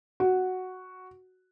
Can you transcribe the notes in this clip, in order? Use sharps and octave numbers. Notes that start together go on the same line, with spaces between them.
F#4